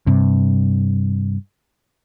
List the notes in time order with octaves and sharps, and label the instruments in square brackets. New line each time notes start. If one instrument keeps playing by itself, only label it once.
[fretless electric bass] G2 C3